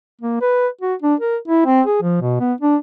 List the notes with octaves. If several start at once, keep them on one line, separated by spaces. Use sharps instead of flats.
A#3
B4
F#4
D4
A#4
E4
C4
G#4
F3
B2
B3
D4